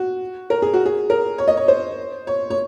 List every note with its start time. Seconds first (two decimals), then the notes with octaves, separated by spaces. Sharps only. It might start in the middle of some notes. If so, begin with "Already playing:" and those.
Already playing: F#4
0.50 A#4
0.62 G#4
0.73 F#4
0.86 G#4
1.10 A#4
1.38 C#5
1.48 D#5
1.57 C#5
1.68 C5
2.27 C#5
2.50 C#5